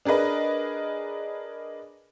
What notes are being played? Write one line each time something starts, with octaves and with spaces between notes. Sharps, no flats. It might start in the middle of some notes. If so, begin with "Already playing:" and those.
D4 G#4 A#4 B4 D#5